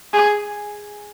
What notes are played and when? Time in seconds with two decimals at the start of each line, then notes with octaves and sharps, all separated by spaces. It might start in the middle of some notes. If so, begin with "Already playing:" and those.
0.13 G#4